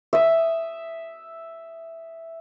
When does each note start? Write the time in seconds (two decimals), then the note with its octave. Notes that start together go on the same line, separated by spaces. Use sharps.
0.13 E5 D#6